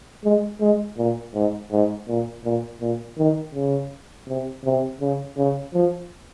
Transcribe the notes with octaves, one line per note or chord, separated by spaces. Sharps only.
G#3
G#3
A#2
G#2
G#2
A#2
A#2
A#2
D#3
C#3
C3
C3
C#3
C#3
F3